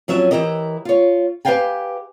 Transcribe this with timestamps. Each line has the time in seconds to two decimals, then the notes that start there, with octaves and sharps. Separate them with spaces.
0.08 F2 F#3 C#4 E5
0.31 E3 E4 G4 A#4 D#5
0.85 F4 C#5
1.45 G4 B4 E5 F5 G5 G#5